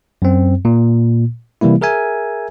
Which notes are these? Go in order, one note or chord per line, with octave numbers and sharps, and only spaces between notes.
F#2 C4
A#2
C3 E3 G3 A#3 E4
G#4 A#4 E5 G#5